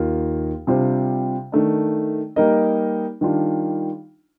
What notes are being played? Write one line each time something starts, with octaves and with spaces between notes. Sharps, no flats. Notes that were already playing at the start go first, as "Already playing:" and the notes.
Already playing: D#2 D#3 A#3 F4
C3 G3 D4 F4 C5
D#3 A3 D4
G3 A#3 D#4 A#4 D#5
D#3 G3 D4 F4